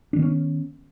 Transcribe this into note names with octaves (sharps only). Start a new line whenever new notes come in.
D#3 B3 C#4 D4